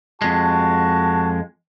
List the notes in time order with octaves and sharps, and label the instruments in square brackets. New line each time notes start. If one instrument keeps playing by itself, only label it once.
[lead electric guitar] F2 G#3 [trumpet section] F#4 A5